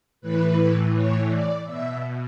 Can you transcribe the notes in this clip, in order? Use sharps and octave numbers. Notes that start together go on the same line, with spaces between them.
A2 E3 B4
C#5
D5
B2 E5